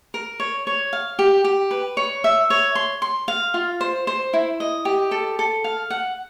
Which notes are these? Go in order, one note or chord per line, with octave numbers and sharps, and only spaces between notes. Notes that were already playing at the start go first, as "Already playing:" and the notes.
A#4
C#5
C#5
F5
G4
G4
B4
C#5
E5
C#5
C6
C6
F5
F4
C5
C5
E4
D#5
G4
A4
A4
F5
F#5